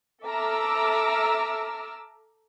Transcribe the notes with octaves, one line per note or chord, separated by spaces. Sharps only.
A4 E5 A#5 D6 E6 F6